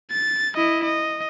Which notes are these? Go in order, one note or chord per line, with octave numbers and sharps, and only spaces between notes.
A6
E4 D#5
D#5